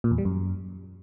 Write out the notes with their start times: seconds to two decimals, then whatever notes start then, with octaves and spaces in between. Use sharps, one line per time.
0.04 A#2
0.11 E2
0.18 G3
0.25 F#2